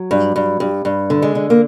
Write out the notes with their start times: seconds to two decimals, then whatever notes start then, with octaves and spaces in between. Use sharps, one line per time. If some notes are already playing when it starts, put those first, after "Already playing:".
Already playing: F#3
0.11 G2
0.36 G2
0.60 G2
0.85 G2
1.10 D3
1.22 G#3
1.35 D3
1.50 A#3